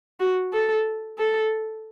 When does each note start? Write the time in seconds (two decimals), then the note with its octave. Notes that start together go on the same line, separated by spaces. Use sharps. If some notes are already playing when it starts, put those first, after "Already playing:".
0.20 F#4
0.53 A4
1.18 A4